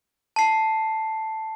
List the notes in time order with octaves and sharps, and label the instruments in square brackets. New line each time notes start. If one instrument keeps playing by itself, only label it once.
[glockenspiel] A5 C7